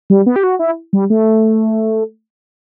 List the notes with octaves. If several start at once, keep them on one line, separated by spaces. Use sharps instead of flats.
G3
B3
G4
F#4
E4
G3
A3